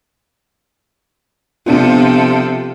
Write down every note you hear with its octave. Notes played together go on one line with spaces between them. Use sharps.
C3 F3 B3 D4 F4 A4